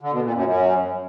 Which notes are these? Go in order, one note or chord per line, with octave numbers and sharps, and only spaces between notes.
D3
B2
A#2
F#2
F#2